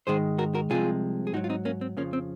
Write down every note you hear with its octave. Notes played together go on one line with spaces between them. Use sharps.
G#2 D#3 G#3 G#4 C5
F#4 A#4
F#4 A#4
C2 C3 F3 G#3 F4 G#4
G#4
G#2 F#3 D#4 F#4
F4
C4 D#4
A#3 C#4
C4
F2 C#3 F3 A#3 C#4
C4